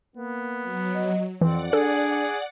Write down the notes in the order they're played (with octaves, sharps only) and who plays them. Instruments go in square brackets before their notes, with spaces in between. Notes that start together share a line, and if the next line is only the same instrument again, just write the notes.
[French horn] A#3 [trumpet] B3
[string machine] F#3
[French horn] D#5
[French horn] F2 [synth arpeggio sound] E3 [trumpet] C4 [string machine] D5 F#5
[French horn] D4 [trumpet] G#4 [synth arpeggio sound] A4